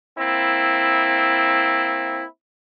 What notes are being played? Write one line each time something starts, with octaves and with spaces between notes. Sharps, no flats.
A#3 C4 E4